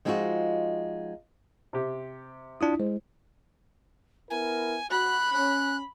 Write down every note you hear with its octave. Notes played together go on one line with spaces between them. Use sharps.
F3 G#3 C4 D#4 F4 F#4
C3 G4
D4 E4 F4 D#6
G#3 C5
B3 E4 A#4 G#5
F#4 B5 F#6
C#4 F#6